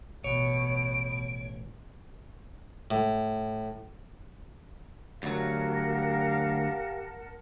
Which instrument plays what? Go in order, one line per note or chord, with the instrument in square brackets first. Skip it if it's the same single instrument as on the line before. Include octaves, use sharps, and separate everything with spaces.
[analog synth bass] A1 [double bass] B2 [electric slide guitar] C#5 [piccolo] D7
[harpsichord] A2
[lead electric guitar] D2 F#3 [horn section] G4 F5 [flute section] A#4 F#5 A5